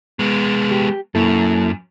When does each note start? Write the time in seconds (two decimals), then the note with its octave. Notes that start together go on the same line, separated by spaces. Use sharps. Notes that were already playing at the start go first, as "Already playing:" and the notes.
0.19 G#3 B3
0.71 G4
1.15 F#2 A#3 E4 A4